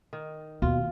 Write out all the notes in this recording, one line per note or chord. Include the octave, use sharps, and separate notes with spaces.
D#3
D#2 B2 F4